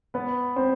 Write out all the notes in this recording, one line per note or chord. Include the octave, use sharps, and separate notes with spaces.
B3 B4
C4 C5